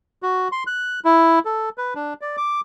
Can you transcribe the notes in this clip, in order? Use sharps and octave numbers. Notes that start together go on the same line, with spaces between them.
F#4
C6
F#6
E4
A4
B4
D4
D5
D6